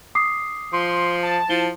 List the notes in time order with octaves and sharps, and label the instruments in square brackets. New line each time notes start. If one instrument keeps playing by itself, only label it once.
[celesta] D6 D#6 C7
[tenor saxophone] F3 [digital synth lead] C6
[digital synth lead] A5
[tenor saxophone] F3 [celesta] E4 G7